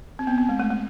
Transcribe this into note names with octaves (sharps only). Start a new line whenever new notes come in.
C4
B3
C4
G#3
A3
A3